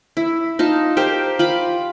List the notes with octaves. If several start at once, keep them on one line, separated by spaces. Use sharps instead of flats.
E4
D#4 F4 A5
G4 A#4 C5 F5
F4 B5 D6